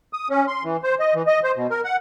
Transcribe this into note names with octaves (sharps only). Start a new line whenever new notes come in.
D#6
C#4
C6
E3
C5
D#5
E3
D#5
C5
B2
A#4
F#5